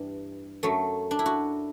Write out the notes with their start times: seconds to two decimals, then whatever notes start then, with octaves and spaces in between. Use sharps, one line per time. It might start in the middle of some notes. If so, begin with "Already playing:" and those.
Already playing: G2 E3 G3
0.63 F#2 F#3 A3
1.11 D4
1.19 E4
1.26 F#4